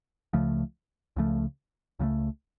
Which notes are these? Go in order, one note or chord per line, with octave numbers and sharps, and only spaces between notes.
C#2 C#3 F3 A3
C#2 C#3 F3 A3
C#2 C#3 F3 A3